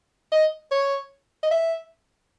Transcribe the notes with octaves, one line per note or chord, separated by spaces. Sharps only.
D#5
C#5
D#5
E5